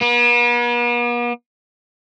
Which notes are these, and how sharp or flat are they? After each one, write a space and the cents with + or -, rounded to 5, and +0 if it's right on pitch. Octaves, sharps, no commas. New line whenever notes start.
B3 -45